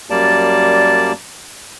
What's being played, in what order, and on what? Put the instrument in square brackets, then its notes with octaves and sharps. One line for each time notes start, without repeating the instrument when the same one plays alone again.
[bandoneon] F#2 G3 A#3 D5 A5